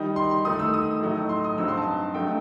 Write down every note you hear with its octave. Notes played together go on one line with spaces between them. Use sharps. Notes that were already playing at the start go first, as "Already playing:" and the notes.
Already playing: D#3 G3 D#4 D#6
C6
C6
D#3 A3 D#4 D#6
E6
D#6
A2 F#3 A3 D#4
C6
D#6
G2 F#3 C4 D#4 E6
C6
A5
G2 F#3 A3 D#4 G5